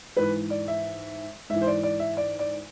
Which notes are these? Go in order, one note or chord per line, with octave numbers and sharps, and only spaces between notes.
G#2 E3 B4
D5
E5
G#2 E3 E5
C5
D5
D5
E5
D5
D5